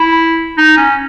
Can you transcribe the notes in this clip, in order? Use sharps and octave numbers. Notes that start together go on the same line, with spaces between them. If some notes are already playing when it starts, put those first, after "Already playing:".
Already playing: E4
D#4
C#4